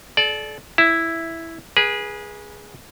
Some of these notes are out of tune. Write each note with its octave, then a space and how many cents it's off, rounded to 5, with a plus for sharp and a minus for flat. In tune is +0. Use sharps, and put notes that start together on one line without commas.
A4 -35 D5 +0
E4 +0 E5 +5
G#4 -5 B4 -35